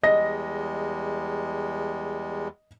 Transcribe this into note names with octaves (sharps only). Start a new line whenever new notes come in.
E2 G3 G#3 D#5 A#6